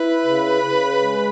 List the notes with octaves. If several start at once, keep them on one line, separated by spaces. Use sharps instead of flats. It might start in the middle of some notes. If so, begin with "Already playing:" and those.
Already playing: E4 B4
C#3
C#3
G#3